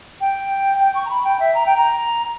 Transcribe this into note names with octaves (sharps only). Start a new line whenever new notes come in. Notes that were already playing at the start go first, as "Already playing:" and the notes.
G5
G5
C#6
A#5
B5
G5
E5
A#5
G5
A#5